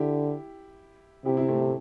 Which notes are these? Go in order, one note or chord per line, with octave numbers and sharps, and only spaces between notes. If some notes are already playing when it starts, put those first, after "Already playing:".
Already playing: D3 E4 G4
C3 E4 G4
C4 E4
A3 C4
A3